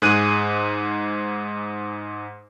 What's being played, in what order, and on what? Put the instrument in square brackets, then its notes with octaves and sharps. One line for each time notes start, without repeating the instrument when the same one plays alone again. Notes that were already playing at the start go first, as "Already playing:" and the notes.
[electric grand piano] G#2 G#4 F#6 D#7